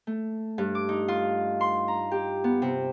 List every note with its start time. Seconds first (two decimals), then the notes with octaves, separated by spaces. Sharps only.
0.07 A3
0.58 G2
0.75 D6
0.89 D#4
1.08 F4
1.61 C6
1.88 A#5
2.11 G4
2.44 B3
2.62 C3